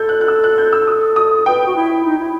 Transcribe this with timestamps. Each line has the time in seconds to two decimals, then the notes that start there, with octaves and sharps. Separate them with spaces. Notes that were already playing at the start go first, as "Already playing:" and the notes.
Already playing: A4 G6
0.09 F#6
0.21 F#6
0.28 E6
0.44 F#6
0.58 G6
0.73 E6
0.87 D#6
1.16 D#6
1.46 B4 G5
1.66 F#4
1.76 E4
2.05 D#4
2.19 E4